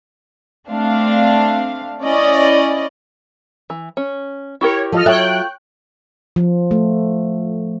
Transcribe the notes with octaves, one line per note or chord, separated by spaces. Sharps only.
A3 C4 D4 F5
C#4 E4 D5 D#5
E3
C#4
E4 G4 A#4 C#5
F3 A4 D#5 F6
F#3 F4 A4 C#5 E5 G5 F#6
F3
A3